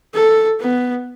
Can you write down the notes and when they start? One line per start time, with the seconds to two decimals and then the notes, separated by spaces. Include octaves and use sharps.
0.14 A4
0.60 B3